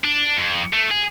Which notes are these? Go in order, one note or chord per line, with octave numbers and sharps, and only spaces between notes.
D4
F2
A3
G#4